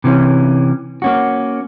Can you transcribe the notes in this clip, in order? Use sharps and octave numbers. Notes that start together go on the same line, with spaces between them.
C3 E3 C#4
A#3 C#4 F#4